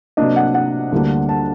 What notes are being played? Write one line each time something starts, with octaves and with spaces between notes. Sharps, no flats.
C3 F#3 A#3 D4 D#5
F#5
F#5
D2 D3 G3 A#3 D4
A5